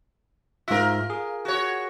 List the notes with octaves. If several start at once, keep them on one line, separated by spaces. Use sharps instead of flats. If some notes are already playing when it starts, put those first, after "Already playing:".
G#2 F4 A#4 E5
G#4
F#4 C#5